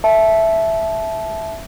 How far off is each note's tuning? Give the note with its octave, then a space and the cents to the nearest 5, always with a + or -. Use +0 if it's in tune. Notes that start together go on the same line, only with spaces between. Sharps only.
E5 +0 A5 -20